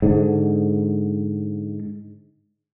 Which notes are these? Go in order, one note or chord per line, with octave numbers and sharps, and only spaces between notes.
G#2 D3